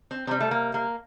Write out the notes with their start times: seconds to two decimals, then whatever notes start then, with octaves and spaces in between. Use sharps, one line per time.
0.11 C4
0.27 C3 G3 C4
0.40 A3
0.51 A#3
0.74 A#3